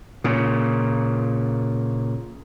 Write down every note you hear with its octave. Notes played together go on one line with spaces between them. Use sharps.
A#2 C#3